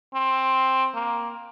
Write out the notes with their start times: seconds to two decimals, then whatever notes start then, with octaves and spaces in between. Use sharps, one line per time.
0.14 C4
0.95 A#3